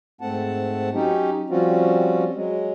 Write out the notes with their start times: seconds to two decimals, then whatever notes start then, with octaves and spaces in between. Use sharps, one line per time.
0.21 G#2 A3 C4 F#5 A5
0.94 F#3 C#4 D#4 G4
1.50 F3 G3 C4 C#4 F4 F#4
2.35 F#3 G#3